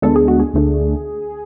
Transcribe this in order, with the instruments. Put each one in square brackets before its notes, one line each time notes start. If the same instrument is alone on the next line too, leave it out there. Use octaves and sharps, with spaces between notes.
[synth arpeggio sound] D2 D3 G#3 B3 D4 A4
G#4
F#4
G#4
D2 D3 A3 D4